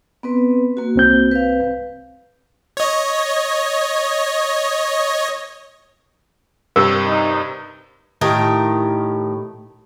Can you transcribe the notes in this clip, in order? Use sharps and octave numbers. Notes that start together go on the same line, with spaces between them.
B3 C4 B4
A#3 F#4
C2 C4 G6
B4 F5
C#5 D#5
G2 C3 A#4
D#4
A2 D#3 G4 A#4